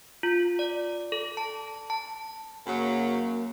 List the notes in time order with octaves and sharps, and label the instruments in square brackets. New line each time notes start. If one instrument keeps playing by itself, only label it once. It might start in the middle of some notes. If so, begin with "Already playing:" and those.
[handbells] F4
D5
A4
A5
A5
[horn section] F#2 C#3 F#3 [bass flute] A#3